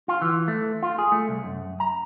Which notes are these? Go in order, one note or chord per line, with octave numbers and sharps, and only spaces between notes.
F4
E3
A3
F4
G#4
A3
C2
F#2
A#5